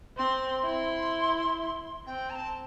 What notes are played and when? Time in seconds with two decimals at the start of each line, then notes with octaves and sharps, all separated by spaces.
0.18 C4 C6
0.65 E4 C6
2.07 C4 G5
2.30 A#5
2.35 A5